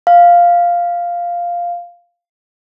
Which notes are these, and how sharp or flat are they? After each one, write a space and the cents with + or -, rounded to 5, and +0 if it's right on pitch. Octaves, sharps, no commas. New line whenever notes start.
F5 +0